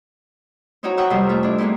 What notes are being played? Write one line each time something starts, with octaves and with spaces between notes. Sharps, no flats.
C4 D#4 E4 F#4 C#5 A#5
A#4 E5 F#5 G5 C#6 D#6
F2 C3 F3 G3 C5
A3 F4 E5
D4 E4
G#3 A#3 C4 D#4 E4